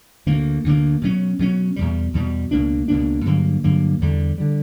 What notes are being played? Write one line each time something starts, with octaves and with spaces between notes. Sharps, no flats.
D2 D3 A#3
D2 D3 A#3
B2 F#3 C#4
B2 F#3 C#4
E2 B2 G3
E2 B2 G3
C#2 B2 A#3 D4
C#2 B2 A#3 D4
G2 D3 F#3 A#3
G2 D3 F#3 A#3
E2 D3 G3
D3 G3